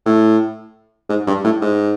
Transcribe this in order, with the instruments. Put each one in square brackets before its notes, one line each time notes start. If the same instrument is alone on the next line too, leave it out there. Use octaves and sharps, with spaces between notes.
[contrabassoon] A2
G#2
G2
A2
G#2